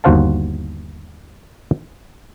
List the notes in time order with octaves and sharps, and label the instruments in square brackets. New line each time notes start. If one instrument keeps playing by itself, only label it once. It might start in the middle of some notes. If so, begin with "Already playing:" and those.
[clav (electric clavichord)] G1 D#2 F#4 C5 F5 A5